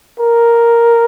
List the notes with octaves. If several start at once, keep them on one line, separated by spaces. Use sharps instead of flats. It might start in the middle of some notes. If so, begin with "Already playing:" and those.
A#4